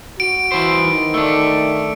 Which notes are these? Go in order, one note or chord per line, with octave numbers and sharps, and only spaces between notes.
F#4 D7
E3 C5
D#3
A3 D4